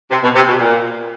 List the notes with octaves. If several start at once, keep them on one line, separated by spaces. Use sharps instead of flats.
C3
B2
C3
B2
A#2